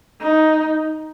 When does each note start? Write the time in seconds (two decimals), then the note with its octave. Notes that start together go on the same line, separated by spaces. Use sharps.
0.21 D#4